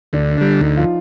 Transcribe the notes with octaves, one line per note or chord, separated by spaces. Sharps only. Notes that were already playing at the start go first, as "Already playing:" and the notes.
D2 D4
D3 G3
D2 D#4
F3 F4